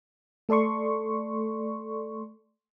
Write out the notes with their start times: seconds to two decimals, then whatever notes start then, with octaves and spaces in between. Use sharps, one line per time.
0.49 A3 A4 D5 C6 C#6